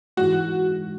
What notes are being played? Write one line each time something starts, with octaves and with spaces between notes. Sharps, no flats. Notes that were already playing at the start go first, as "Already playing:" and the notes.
G#2 E3 G#3 F#4